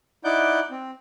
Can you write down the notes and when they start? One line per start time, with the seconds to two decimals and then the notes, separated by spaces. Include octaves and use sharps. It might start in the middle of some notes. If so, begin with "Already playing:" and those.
0.24 D#4 E4 D5 F#5 D6 G6
0.71 C4